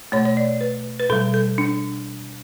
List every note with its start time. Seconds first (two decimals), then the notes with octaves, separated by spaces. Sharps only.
0.12 B2 A3 C#5
0.25 C#5
0.37 D5
0.61 B4
1.00 B4
1.10 B2 G3 A4
1.34 A4
1.58 D4